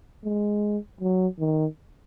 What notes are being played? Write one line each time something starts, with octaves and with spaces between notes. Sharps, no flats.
G#3
F#3
D#3